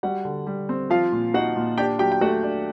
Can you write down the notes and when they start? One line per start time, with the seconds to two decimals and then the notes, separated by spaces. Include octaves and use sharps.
0.03 G3 F#4 F#5
0.25 D3
0.47 G3
0.69 C4
0.90 F3 F4 F5
1.12 A#2
1.34 D#4 F#4 F#5
1.56 A#2
1.78 D4 G4 G5
1.99 F#3 G4 G5
2.12 G5
2.21 A3 F#4 F#5
2.43 D4